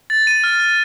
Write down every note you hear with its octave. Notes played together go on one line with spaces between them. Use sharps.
A6
D#7
F6
F6